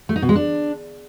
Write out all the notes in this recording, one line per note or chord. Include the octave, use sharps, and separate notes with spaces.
A3
D#4
B2
G#3
D4